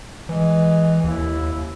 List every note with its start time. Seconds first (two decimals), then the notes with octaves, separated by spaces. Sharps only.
0.29 E3 G#3
1.04 D#2 E4